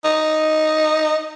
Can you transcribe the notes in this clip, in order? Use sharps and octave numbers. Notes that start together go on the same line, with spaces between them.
D#4